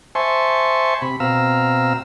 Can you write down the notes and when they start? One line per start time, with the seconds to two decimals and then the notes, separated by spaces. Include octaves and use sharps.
0.15 C5 E5 G#5 A5 C6 C#6
1.02 C3 B5
1.20 B2 C4 F5 A#5 E6